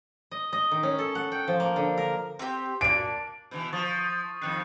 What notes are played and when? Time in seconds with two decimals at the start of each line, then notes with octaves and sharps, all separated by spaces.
0.31 D#5
0.53 D#5
0.71 D#3
0.83 C#4
0.99 A4
1.15 F#5
1.32 G5
1.48 F3
1.60 A#3
1.76 D3
1.97 A#4
2.39 C4 G4
2.81 A#3 D4 D7
3.51 B2 D3 E3
3.73 F3 C#6 D#6 A6
4.42 F2 D3 D#3 F#6 C7